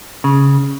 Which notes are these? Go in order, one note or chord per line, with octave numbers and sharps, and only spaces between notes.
C#3